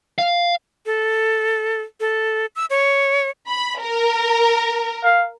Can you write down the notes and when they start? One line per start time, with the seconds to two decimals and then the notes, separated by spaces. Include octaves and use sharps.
0.19 F5
0.86 A4
2.00 A4
2.56 E6
2.70 C#5
3.47 B5
3.79 A#4
5.04 F5